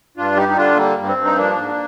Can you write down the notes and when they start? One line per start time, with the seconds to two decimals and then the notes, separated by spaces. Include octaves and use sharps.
0.17 G2 D4 F4
0.36 G3 D#4 G4
0.49 D#4
0.57 D3 D4 F4
0.76 G3 A#3
0.97 G2
1.07 C4
1.16 G2
1.25 D#4
1.36 F3 A#3 D4
1.56 G#2